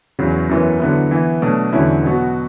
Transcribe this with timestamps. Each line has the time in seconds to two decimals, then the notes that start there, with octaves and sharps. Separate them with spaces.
0.19 E2 C#3 F#3
0.49 F#2 E3 B3
0.80 D3 F#3 B3 E4
1.11 E3 B3 E4
1.42 B2 F#3 A3 D4
1.73 E2 D3 F#3 C#4 E4
2.03 B2 F#3 B3 F#4